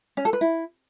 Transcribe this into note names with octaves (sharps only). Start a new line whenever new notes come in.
C#4
A4
B4
E4